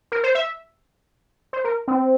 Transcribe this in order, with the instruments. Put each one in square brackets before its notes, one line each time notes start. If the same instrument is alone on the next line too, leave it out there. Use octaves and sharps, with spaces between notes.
[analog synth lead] A#4
C5
E5
C5
A#4
C4